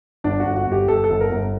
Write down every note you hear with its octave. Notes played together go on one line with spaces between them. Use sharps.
G1 D4
F#4
G1
F#4
G1
G4
G1 A4
A4
G1
A#4
G1